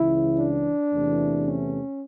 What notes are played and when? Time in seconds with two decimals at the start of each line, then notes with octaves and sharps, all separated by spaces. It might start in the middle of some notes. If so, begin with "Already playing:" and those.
Already playing: C#2 C#3 E3 E4
0.40 D4
0.93 E2 C3 E3 A3
1.46 C#4